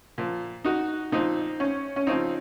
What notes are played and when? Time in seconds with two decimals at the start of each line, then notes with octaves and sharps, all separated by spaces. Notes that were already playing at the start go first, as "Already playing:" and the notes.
0.18 A#2 F3
0.65 D#4 F#4
1.12 A#2 F3 C4 D#4
1.60 C#4
1.96 C#4
2.07 C#3 F3 C4 D#4